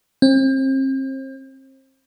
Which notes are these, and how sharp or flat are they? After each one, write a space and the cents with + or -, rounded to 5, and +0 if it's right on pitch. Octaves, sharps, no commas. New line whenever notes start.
C4 +35